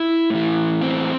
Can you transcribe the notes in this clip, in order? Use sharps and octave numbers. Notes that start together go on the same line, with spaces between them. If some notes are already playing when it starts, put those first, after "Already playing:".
Already playing: E4
A2 E3
C4